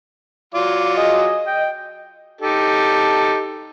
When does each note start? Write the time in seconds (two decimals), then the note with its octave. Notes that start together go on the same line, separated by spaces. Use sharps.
0.54 F#3 F4 D5
0.97 G#4 D#5
1.47 G5
2.41 D#4 G4 A4